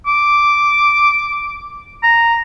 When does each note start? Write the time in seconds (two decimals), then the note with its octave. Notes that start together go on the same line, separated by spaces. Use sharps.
0.07 D6
2.03 A#5